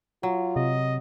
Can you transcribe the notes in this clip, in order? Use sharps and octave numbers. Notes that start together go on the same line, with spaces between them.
F#3 F4
C3 D#5